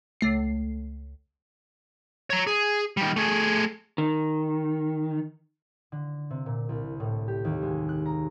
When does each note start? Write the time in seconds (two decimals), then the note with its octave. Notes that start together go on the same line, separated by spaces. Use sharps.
0.21 C#2 A3 C7
2.30 C#5 A#5
2.47 G#4
2.97 D#3 G3
3.16 A3 G#4
3.98 D#3
5.92 D3
6.30 C3
6.46 A#2
6.69 C2
7.00 A2
7.28 G4
7.45 D#2
7.63 G#3
7.89 F#6
8.06 A#5